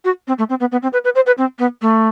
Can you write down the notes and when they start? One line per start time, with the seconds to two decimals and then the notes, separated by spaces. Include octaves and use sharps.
0.05 F#4
0.28 C4
0.38 A3
0.50 C4
0.60 B3
0.72 B3
0.83 C4
0.93 B4
1.04 B4
1.15 C5
1.27 B4
1.38 C4
1.59 B3
1.82 A3